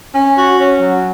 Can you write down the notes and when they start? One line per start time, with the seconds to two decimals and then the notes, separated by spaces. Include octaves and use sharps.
0.15 C#4
0.37 F#4
0.58 C#4
0.79 F#3